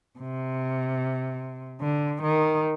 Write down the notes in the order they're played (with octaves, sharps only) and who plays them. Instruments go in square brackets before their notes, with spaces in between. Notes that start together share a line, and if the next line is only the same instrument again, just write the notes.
[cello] C3
D3
D#3